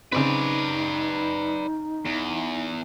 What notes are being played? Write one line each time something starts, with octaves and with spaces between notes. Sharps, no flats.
C#3 C4 D#4 B4 D5
E2